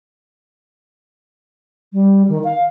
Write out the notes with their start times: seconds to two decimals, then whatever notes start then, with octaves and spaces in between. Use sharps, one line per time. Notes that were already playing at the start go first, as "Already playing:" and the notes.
1.93 G3
2.29 D#3
2.44 F5